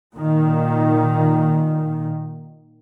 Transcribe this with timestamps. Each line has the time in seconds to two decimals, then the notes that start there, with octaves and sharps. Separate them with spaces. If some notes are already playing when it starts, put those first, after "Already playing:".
0.15 A#2 D#3